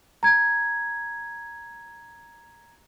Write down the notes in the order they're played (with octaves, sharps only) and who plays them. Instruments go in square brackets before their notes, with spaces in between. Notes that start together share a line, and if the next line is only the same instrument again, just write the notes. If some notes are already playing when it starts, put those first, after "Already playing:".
[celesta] A#5 G#6